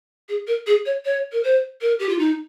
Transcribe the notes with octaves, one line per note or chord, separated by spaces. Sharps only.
G#4
A#4
G#4
C#5
C#5
A#4
C5
A#4
G4
F4
D#4